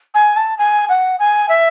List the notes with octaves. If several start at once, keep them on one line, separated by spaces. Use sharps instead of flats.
G#5
A5
G#5
F#5
G#5
E5